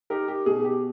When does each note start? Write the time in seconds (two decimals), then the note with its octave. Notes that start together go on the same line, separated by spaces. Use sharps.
0.10 D#4 G4 A#4
0.28 G4
0.46 B2 G#4
0.64 G4